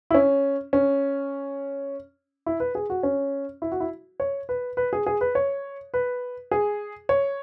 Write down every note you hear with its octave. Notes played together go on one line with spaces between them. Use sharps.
E4
C#4
C#4
E4
B4
G#4
F#4
C#4
E4
F#4
E4
C#5
B4
B4
G#4
G#4
B4
C#5
B4
G#4
C#5